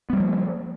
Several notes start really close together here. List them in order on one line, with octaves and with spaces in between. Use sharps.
B3 G3 A#3 F3